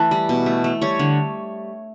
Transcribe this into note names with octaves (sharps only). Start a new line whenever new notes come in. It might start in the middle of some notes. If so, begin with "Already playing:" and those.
Already playing: E3 A3 A4 B4
G3
B2
A3
A3
G3 C#5
D3